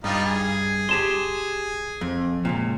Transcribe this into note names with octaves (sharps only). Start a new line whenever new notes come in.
G2 G3 D#4 F4
G#4
G4 A5 C6
F2
C#2 F#2 A#2